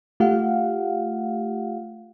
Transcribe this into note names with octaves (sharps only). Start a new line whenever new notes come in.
A3 F4 G4 F5 F#5